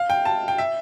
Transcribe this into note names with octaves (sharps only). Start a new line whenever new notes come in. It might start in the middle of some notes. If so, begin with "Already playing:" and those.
Already playing: F5
G5
A5
G5
E5